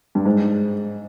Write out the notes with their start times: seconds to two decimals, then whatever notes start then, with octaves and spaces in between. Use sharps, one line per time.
0.15 G2
0.25 G#2